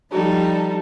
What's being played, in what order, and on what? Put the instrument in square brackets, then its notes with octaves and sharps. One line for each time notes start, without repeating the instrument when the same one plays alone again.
[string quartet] F3 G3 D#4 A4